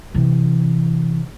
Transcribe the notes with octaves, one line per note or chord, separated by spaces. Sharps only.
C3 E3